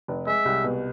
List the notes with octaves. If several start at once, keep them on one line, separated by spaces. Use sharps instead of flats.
F1
G#3 E5
C2
B2